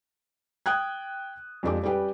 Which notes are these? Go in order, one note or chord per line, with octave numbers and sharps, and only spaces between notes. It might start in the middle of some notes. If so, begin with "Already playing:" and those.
G5 D#6 F#6 G#6
F2 F3 G#3 D4 G4 D6
G3 C#4 G4 B4 G5